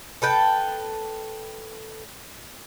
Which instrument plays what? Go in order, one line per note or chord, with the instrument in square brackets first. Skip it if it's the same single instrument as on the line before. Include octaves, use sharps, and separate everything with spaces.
[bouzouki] A4 B4 G5 A5